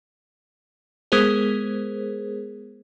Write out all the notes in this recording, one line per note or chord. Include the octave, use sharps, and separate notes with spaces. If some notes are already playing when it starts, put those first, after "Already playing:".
G#3 B3 G#4 A#4 C5